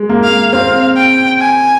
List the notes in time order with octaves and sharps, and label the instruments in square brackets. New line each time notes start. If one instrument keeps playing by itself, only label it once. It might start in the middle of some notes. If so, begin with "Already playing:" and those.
Already playing: [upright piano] G#3
A#3
[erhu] F5
[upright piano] C4 [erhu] F5
[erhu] G5
G#5